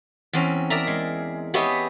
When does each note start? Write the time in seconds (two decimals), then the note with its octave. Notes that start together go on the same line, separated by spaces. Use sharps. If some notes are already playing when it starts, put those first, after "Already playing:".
0.33 E2 C4 C#4
0.70 A#4 D5 E5 A#5
0.87 G#3
1.54 B3 G4 G#4 C#5 D#5 E5